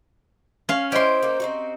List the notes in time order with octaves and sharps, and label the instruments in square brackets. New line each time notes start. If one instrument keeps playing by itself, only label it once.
[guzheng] C#4 F5
[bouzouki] E4 C#5 D#5 [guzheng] G4 C6 [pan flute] C5
[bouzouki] A#3 D#4
C4 D#4 F#4